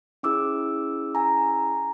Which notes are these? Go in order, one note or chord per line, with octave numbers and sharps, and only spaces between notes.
C#4 E4 G#4 D6 E6
G#5 A#5